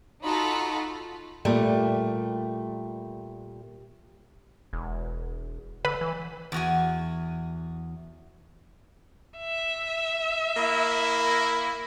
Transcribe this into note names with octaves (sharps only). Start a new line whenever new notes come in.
D#4 F4 F#4 A4 B5
A#2 G3 A3
E1
D3 B4
E3
E2 F#4 G#5
E5
A#3 E4